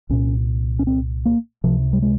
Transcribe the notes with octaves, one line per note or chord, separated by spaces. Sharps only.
C2 A#2 C#4
C#4
C4
A#3
C#2 C3 F3
G3
G#3